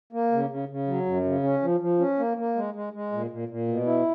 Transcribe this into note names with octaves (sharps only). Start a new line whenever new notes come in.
A#3
C#3
C#3
C#3
F#3
F#2
C#3
C#4
F3
F3
C#4
A#3
A#3
G#3
G#3
G#3
A#2
A#2
A#2
B2
E4